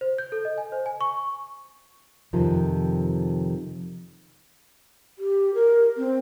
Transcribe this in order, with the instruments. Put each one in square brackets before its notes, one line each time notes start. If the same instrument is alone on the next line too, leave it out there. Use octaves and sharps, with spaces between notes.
[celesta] C5
G6
A4
D#5
G#5
C5
G#5
C#6
[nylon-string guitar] F2 C3 D#3 F3
[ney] G4
A#4
C4